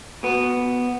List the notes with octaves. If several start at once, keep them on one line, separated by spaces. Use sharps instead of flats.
B2 B3